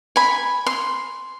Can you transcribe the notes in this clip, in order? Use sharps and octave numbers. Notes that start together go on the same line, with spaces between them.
G#5 B5
C6